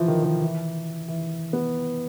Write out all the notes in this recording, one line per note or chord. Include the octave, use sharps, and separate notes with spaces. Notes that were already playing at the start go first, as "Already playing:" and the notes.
Already playing: E3 F3
D#3
D#3
E3
E3
B3